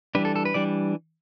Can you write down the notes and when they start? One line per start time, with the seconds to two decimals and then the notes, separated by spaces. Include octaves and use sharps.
0.15 E3 G3 D4 B4
0.25 A4
0.36 A4
0.45 B4
0.54 E3 G3 D4 D5